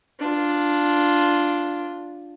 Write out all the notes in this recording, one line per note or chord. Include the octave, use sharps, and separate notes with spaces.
D4 F4